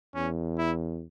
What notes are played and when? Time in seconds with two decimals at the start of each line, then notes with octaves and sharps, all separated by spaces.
0.15 E2 C#4
0.58 E4